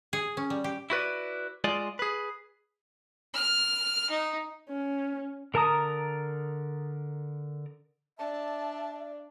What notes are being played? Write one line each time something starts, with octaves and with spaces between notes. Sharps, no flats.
G#4
C#4
G3
G4
E4 F#4 B4 D5
G#3 F4 D5 D#5
G#4 B4
F6
D#4
C#4
D3 A#4 A5 A#5 D#6
D4 D5 E5 A5